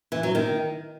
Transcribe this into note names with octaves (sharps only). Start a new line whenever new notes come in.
E3
F#3
D#3